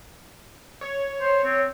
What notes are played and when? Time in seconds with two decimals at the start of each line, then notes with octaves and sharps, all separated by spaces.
0.81 C#5
1.21 C5
1.44 C4